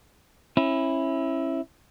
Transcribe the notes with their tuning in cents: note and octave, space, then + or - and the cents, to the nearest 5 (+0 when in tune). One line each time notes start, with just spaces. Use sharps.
C#4 -35 E4 +0